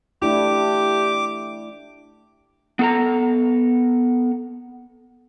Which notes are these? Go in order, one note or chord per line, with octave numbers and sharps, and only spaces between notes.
A3 D4 E4 G4 D6
B3 A4 A#5